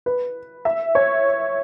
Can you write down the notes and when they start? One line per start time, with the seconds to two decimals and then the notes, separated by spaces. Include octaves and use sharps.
0.06 B4
0.65 E5
0.95 C#5